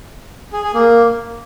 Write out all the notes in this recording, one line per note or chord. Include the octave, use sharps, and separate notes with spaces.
G#4
G#4
A#3